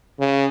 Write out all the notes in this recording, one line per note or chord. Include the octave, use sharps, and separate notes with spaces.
C#3